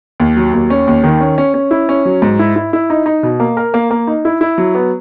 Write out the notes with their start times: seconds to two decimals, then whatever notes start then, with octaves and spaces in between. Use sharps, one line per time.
0.20 D#2
0.37 F#3
0.53 D#2
0.70 C#4
0.87 D#2
1.04 D#3
1.20 C#4
1.38 C#4
1.54 C#4
1.71 E4
1.89 C#4
2.05 F#3
2.22 G#2
2.39 E4
2.56 E4
2.73 E4
2.90 D#4
3.06 D#4
3.23 B2
3.40 A#3
3.57 A#4
3.74 A#3
3.91 A#3
4.07 D#4
4.25 E4
4.41 E4
4.58 F#3
4.75 B3